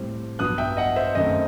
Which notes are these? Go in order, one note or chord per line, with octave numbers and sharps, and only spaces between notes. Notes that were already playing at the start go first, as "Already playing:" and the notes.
Already playing: A2 G3 C4
G2 F#3 B3 D#6 F#6
E5 G5
D#5 F#5
C5 E5
F#2 D#3 A3 C4 D#5